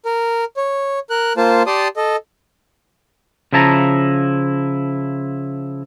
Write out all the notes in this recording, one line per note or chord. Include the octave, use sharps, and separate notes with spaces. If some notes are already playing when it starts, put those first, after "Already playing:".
A#4
C#5
A#4 F#6
A#3 F4 C5 A5
G4 D5 A5 C6 D#6
A4 D#5
C#3 F3 E4 A5 A#5